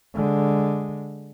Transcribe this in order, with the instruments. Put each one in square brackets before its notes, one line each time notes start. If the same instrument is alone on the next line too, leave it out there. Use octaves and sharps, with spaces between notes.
[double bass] D3 G#3